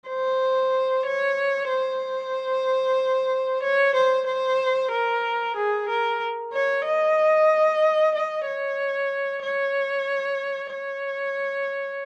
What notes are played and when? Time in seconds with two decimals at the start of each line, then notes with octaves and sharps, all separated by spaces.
0.08 C5
1.06 C#5
1.69 C5
3.63 C#5
3.95 C5
4.27 C5
4.92 A#4
5.56 G#4
5.89 A#4
6.53 C#5
6.85 D#5
8.15 D#5
8.46 C#5
9.43 C#5
10.72 C#5